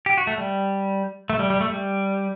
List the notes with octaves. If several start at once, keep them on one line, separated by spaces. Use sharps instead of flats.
G4
F#4
A3
G3
A3
G3
G3
A3
G3